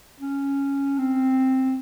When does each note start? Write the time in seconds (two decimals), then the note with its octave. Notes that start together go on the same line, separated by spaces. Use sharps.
0.20 C#4
0.98 C4